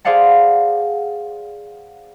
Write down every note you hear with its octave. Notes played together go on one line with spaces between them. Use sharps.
G#4 C5 D5 F5 F#5 A5